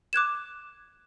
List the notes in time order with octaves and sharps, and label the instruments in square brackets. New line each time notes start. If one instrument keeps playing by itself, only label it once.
[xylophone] D6 F#6 G#6 E7